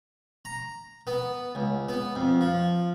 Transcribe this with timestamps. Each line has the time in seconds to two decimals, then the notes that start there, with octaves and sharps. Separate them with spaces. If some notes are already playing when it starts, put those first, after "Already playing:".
0.45 A#5
1.07 B3
1.55 C#2
1.89 B3
2.15 F2
2.41 F3